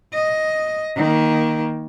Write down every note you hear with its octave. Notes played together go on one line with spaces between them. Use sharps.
D#5
D#3 A#3